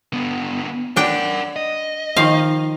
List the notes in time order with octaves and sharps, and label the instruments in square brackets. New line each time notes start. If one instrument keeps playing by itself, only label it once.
[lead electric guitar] D3 B3
[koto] D4 G5 [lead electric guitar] A#4 F#5
[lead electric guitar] D#5
[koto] D#3 F3 F5